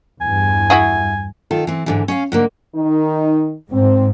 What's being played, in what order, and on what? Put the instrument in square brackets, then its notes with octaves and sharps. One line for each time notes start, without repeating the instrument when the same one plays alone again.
[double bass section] E2 G2 [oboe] G#5
[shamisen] E4 F#4 G#4
[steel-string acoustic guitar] D#3 F4 A4
E3 C4
G#2 D3 E3
C#4 D#5 F5
G#2 D3 A#3
[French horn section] D#3 D#4
[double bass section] G#2 [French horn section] C4